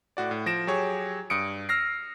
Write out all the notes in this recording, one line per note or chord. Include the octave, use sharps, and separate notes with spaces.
A2 F#4 D5
A2
F3 A#6 D7 E7
F#3 G4 G#4 C#5
G2 D#6 C#7 D7
E6 F6 A#6 C7